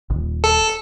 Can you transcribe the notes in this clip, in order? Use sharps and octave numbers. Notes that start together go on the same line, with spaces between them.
D#1 G#1
A4